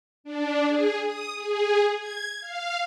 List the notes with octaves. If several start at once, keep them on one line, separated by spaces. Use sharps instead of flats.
D4
G#4
D#6
G#4
G#6
F5